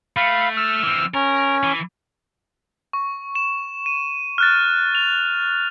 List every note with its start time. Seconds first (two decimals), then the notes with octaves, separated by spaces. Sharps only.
0.17 A3 F5 B5
0.57 E6 F6
0.83 E3 C4
1.14 C#4 A#4
1.63 E3
2.93 C#6
3.35 E7
3.86 D#7
4.38 F6 F#6 A6
4.95 F7